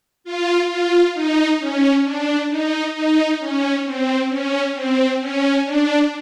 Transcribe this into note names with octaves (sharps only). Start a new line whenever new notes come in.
F4
F4
D#4
C#4
D4
D#4
D#4
C#4
C4
C#4
C4
C#4
D4